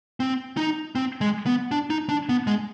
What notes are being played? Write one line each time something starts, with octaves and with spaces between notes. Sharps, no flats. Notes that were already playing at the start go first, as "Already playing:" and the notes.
C4
D#4
C4
G#3
B3
D4
D#4
D4
B3
G#3